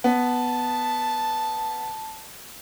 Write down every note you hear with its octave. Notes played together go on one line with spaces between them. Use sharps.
B3 A5